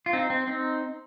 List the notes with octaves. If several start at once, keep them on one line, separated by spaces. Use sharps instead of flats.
F4
C4 D#4
C4
C4 D#4